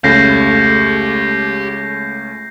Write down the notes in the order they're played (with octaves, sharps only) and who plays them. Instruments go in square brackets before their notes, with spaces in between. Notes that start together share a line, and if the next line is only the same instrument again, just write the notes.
[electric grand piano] C#2 C#4 [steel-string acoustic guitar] A3 [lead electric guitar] G4 F5 [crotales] G6 A#6 C7